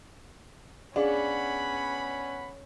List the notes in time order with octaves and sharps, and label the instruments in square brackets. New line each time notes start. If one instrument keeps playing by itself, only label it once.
[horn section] B3 F#5 B5 [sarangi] C#4 [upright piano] D4 [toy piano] G#4 F5